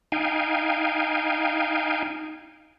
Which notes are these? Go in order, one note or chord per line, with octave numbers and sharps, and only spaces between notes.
D#4 F5 G5 G#5